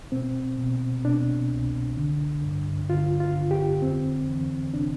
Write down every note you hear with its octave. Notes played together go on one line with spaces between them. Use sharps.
B2 C4
B2
B2 D4
C2
D3
G2
D3 F4
F4
D3
G4
F2 C4
E3
C3 D4